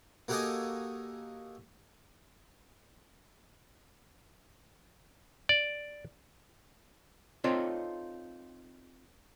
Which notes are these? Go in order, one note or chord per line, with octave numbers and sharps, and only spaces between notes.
A#3 F#4 G4 A4 D#5 G#5
D5
C4 D#4 F4 A4 C#5 D5